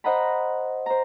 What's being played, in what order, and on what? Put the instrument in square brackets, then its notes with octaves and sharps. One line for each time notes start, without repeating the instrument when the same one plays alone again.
[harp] C5 D#5 F#5 A#5 B5
C5 A#5